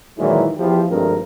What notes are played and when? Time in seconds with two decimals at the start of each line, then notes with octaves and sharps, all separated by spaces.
0.18 A#2 D#3 E3 F#3 G#3 E4
0.57 E2 F3 E4 G4
0.89 G#1 G2 C3 F3 A3 A#4